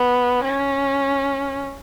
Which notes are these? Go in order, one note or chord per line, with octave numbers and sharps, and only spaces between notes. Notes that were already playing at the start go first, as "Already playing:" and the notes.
Already playing: B3
C#4